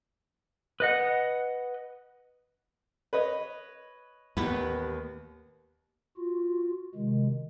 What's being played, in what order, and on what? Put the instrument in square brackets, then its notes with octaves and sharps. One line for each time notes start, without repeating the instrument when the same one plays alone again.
[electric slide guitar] B4 D#5 F#5
[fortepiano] B4 C#5 D#5
[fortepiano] A1 B5 [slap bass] D#2 [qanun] B3 B4
[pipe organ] F4 F#4
C3 D#3 G#3